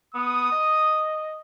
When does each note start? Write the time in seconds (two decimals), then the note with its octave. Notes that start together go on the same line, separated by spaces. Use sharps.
0.14 B3 D#6
0.52 D#5